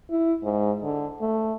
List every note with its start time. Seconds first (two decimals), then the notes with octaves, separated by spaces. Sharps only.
0.10 E4
0.43 G#2
0.83 D3
1.21 A3